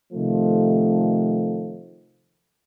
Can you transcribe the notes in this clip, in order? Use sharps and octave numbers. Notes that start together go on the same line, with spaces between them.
C3 D#3 F3 A3